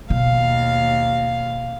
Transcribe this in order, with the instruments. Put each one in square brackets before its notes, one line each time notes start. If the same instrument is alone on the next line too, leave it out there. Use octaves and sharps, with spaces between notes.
[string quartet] D#2 F5 [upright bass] B2